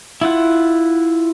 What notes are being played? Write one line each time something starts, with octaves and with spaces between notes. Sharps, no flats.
E4 F4 F#5